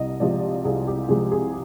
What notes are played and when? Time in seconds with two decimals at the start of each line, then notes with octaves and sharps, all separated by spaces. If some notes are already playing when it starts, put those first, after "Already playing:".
Already playing: C2 C3 D#5
0.20 C3 F3 G#3 D5
0.65 C2 G#4
0.87 G4
1.09 C3 F3 G#3 G#4
1.32 G#4